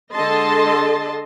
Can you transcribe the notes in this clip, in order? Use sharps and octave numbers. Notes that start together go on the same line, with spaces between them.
D3 G#3 A4 D#5 A5 C6